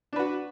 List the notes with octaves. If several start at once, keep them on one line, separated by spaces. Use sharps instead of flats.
D4 F#4 B4